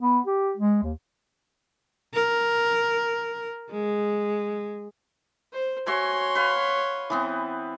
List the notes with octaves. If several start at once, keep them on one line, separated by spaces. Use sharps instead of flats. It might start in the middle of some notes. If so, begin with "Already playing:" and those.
B3
G4
G#3
D#2
A#4
G#3
C5
F#4 C#5 E5 G#5 C6
B4 F5
E3 B3 C4